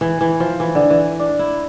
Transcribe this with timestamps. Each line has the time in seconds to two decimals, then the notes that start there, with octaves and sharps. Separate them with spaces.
0.01 E3
0.21 E3
0.40 F3
0.60 E3
0.75 D3
0.90 E3
1.20 D4
1.39 E4